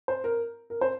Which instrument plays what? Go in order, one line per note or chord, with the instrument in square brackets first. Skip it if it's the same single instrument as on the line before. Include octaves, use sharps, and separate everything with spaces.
[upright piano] C5
A#4
A#4
C5